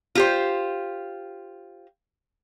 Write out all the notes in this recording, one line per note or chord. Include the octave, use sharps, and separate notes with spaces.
F4 G4 C5